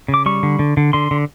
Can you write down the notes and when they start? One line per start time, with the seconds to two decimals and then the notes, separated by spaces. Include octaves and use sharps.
0.08 C#3
0.14 D6
0.26 G3 C#6
0.43 D3
0.59 D3
0.77 D3
0.93 D3 C6
1.11 D3